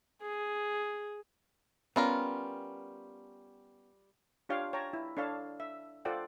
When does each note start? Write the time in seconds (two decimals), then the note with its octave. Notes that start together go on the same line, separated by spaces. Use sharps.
0.22 G#4
1.96 G3 B3 C#4 F4 A#4
4.49 D4 F4 G4 C#5 F5 G5
4.73 C#5 G5 A5 A#5
4.93 E4
5.17 D4 A4 C#5 F5 A5
5.60 E5
6.05 F4 A4 C5 D5 F#5 G5